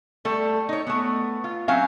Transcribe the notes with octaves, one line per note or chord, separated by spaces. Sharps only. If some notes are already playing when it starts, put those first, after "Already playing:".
G3 A3 A4
D#4 C#5
A3 B3
F4
F#3 C4 C#4 E5 F5